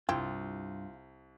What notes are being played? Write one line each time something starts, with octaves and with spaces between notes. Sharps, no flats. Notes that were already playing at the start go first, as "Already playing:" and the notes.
C2 G2 E4 F4 G4